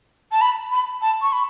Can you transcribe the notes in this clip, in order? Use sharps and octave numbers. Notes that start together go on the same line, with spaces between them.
A5
B5
B5
A5
C#6
B5